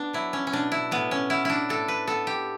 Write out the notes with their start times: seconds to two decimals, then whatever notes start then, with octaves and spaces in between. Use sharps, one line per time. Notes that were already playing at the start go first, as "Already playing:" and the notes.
Already playing: B3 D4
0.13 F#3 E4
0.33 C#4
0.47 C#4
0.52 B2 D4
0.72 E4
0.91 A2 B3
1.11 C#4
1.30 B3 E4
1.45 D4 E4
1.69 A2 A4
1.88 B4
2.07 B3 A4
2.27 G4